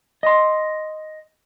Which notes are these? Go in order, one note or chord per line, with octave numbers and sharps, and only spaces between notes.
D#5 C6